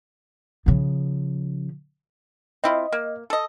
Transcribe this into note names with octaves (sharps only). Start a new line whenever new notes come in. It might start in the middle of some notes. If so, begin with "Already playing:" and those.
C#3 F3
C4 E4 F4 D#5
A#3
A4 D#5